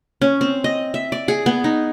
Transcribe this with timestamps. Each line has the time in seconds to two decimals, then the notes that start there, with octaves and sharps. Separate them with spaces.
0.22 C#4
0.41 C4
0.64 D#5
0.94 E5
1.12 D5
1.28 G#4
1.46 B3
1.64 D#4